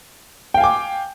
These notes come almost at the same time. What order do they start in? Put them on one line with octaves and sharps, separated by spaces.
G5 F5 G#5 D6